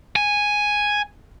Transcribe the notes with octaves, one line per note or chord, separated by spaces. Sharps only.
G#5